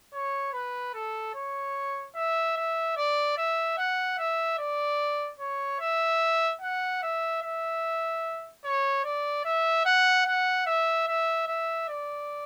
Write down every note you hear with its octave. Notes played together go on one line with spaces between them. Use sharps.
C#5
B4
A4
C#5
E5
E5
D5
E5
F#5
E5
D5
C#5
E5
F#5
E5
E5
C#5
D5
E5
F#5
F#5
E5
E5
E5
D5